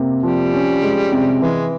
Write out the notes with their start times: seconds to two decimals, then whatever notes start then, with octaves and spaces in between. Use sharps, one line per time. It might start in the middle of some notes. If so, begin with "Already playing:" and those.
Already playing: C3 A#3
0.23 F3 G3
0.53 C#4
0.83 G#3
1.12 C3
1.42 E3 G#3